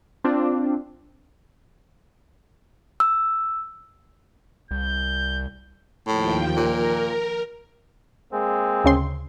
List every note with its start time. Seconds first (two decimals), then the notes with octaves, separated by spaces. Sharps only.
0.24 C4 D4 F4
3.00 E6
4.71 C2 G6
6.07 D#2 A2 F3 G5
6.56 A#2 A#4
8.33 G#3 A#3 C4
8.84 D2 C#3 C6